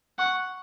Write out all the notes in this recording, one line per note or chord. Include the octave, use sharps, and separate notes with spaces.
F#5 C#6